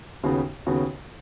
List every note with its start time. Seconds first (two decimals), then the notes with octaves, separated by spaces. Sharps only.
0.23 D#2 C#3 B3 F#4
0.66 D#2 C#3 B3 F#4